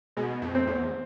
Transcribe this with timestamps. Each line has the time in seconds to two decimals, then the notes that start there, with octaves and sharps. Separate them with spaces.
0.17 B2 G#3
0.42 F2
0.55 C4
0.67 E2